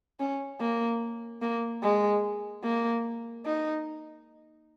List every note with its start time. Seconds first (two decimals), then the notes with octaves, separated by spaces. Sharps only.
0.20 C#4
0.61 A#3
1.42 A#3
1.83 G#3
2.64 A#3
3.46 D#4